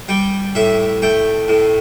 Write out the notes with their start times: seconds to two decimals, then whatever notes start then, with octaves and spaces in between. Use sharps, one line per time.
0.09 G3 G5
0.55 A2 E5
1.02 A3 G5
1.48 A2